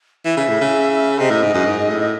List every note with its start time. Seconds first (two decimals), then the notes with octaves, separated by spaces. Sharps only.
0.25 E3 E5
0.37 C#3
0.48 A2
0.61 C#3
1.19 C3 D#5
1.30 A2
1.43 G#2
1.54 F#2
1.65 G#2
1.89 A2